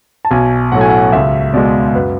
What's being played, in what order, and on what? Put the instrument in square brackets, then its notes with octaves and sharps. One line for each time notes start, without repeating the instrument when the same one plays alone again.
[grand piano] A5
B1 G#5
A2 F#3 A3 F#5
G#5
F#5
C#2 E5
B2 G#3 D5
F#2 B4